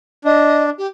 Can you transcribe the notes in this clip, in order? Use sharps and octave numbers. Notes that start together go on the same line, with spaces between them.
D4 D#5
G4